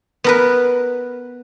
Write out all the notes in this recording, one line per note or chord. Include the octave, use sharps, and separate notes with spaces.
B3 A#4 B4